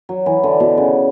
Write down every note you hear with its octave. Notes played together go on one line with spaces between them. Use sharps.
F#3
E3
D3
B2
C#3